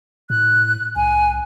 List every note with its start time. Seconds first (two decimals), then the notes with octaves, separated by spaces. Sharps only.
0.30 A2 F#6
0.96 C2 G#5